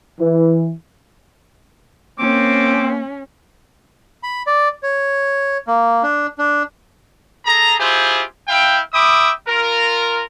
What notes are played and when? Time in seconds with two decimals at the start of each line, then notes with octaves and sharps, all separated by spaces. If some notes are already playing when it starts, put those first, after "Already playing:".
0.20 E3
2.19 A#3 C4 C#4 D6
4.23 B5
4.47 D5
4.83 C#5
5.67 A#3
6.03 D4
6.38 D4
7.46 G#4 A4 A#5
7.79 E4 F4 G4 G#4 C5
8.48 E4 F5 G5
8.93 E5 G5 B5 D6 D#6
9.47 F4 A#4